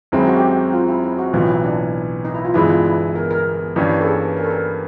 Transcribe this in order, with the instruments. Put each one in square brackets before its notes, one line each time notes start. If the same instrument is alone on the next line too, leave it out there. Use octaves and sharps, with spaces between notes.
[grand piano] F#2 D#3 G#3 C4 [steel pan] E4
[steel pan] F#4
G4
F#4
F4
E4
E4
F#4
[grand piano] B1 A2 E3 [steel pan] F4
[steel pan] D#4
E4
D4
D#4
E4
F4
[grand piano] G1 G2 E3 G#3 B3 [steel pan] E4
[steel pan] F4
E4
A#4
A#4
[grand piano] G2 E3 G3 A#3 C#4
[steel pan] A4
G#4
A#4
A4
A#4